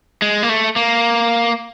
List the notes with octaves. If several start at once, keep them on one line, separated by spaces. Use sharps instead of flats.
G#3
A#3
A3
A#3